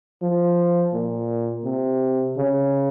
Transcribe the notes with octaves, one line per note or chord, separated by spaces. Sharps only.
F3
A#2
C3
C#3